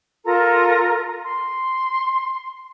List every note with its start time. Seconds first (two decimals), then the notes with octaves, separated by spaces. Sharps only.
0.24 F4 A4 A#4 A#5
1.24 C6